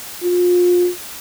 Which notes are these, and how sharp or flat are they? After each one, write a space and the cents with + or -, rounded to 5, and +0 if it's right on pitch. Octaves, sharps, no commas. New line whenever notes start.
F4 +30